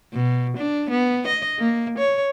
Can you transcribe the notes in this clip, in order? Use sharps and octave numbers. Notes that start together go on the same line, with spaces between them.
B2
D4
B3
D#5
A#3
C#5